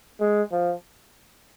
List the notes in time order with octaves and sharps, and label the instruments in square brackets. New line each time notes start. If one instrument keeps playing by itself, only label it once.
[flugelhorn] G#3
F3